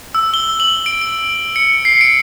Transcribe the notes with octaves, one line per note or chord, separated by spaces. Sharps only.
E6
G7
F#7
D7
D7
C#7
C7
D7